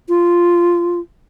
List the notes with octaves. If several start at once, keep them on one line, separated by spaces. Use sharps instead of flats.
F4